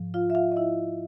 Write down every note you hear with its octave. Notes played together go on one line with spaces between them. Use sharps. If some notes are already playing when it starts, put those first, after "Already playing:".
Already playing: G#2 F3
F4 F5
E5
F4 F5
D#5
E4 E5